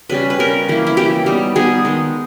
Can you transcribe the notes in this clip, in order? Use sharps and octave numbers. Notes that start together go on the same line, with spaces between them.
C#3 G3 C#4 B4
B4
C#3 G3 C#4 A#4
E3 A#3 E4
E4
E3 A#3 E4 G4
G3 B3 D#4
G3 B3 D#4 G#4
D#3 G#3 D#4